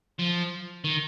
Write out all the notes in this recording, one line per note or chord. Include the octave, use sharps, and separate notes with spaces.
F3
D#3